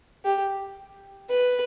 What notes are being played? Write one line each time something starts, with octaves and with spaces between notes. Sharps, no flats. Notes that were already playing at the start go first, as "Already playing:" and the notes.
G4
B4